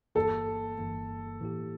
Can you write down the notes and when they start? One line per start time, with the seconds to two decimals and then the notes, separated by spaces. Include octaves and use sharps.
0.15 G1 G2 E3 A#3 A4
0.78 G1 G2 E3 A#3
1.41 A2 E3 A#3 E4 G4